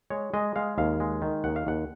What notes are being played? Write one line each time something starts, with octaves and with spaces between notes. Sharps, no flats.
G#3 C#5
G#3 D#5
G#3 F5
D#2 F5
G#3
D#3
D#2 F#5
F5
D#2 F#5